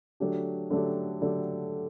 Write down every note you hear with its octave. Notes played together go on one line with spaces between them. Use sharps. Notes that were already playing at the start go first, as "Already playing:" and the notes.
D3 F#3 A3 D4 G4
D3 F#3 A3 D4 G4
D3 F#3 A3 D4 G4